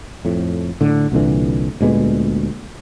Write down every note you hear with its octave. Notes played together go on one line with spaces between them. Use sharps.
F2 A2
A2 D3
C2 A#2 D3 E3
D2 A#2 G#3 B3